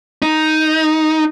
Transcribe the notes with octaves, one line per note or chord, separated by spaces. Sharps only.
D#4